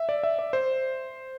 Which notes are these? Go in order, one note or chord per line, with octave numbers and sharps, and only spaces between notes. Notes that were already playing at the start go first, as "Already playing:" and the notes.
Already playing: E5
D5
E5
D5
C5